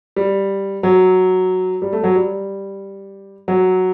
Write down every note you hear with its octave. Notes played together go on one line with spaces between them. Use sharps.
G3
F#3
G3
A3
F#3
G3
F#3